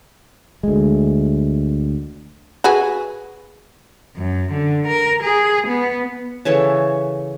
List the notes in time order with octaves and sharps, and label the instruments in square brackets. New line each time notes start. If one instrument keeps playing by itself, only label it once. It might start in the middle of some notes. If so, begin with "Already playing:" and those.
[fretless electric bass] D2 G#3
[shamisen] F#4 G#4 B4
[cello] F#2
D3
A#4
G#4
B3
[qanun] C#3 E3 A4 C#5